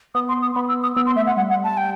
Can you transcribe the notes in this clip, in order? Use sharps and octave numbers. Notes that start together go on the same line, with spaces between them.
B3 D#6
C6
D#6
B3 B5
E6
D#6
B3 E6
C6
A3 E5
F#5
G3 F#5
F#5
A5
G5